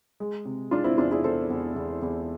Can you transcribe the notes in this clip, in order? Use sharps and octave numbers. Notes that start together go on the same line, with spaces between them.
G#3
C3
G#3 D4 F4
C4 E4
E2 D4 F4
E4 G#4
E2 A4 C5
E2
E2
E2